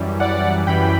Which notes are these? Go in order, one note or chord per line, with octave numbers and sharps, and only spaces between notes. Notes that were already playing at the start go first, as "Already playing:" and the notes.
Already playing: F#2 E3 G3
D5 F#5
F#2 E3 G3 G5 B5